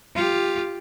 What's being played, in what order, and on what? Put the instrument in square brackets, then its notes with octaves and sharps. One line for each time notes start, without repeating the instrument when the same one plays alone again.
[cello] F4 G4